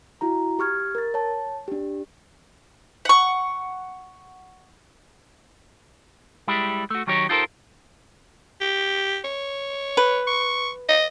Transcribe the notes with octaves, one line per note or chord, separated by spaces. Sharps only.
E4 F#4 A#5
G4 C#6 F6 G#6
A#4 A6
C#5 A5
D4 G4
F#5 C#6
G3 G#3 E4 G4
A3 F#4
D#3 F#3 D#4 G4 C#5
D#4 F4 G4 A4 A#4 C5
G4
C#5
B4
C#6
D#5